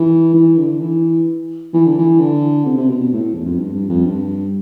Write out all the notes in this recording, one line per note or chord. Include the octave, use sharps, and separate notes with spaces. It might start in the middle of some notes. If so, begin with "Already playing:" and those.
Already playing: E3
E3
D3
E3
E3
D3
E3
D3
C3
C3
B2
B2
A2
E2
F2
G2
G2
F2
G2